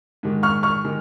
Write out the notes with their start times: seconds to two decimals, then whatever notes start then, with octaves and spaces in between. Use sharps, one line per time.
0.23 G#2 D#3 G#3
0.43 C#6 F6
0.63 C#6 F6
0.84 D#3 G#3